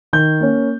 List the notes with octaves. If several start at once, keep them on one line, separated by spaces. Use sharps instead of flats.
D#3 G6
A#3 C#4